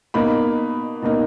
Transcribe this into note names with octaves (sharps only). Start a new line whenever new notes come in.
B2 A#3 D#4 B5
B2 A#3 D#4